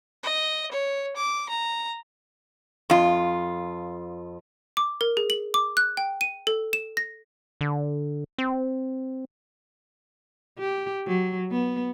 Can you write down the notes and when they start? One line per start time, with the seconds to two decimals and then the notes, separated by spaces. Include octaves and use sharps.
0.23 D#5
0.72 C#5
1.16 D6
1.49 A#5
2.90 F2 F4
4.77 D6
5.01 A#4
5.17 G#4
5.30 F#7
5.54 D6
5.77 F#6
5.97 G5
6.21 D#7
6.47 A4
6.73 E7
6.97 A#6
7.61 D3
8.38 C4
10.59 G4
11.07 F#3
11.52 B3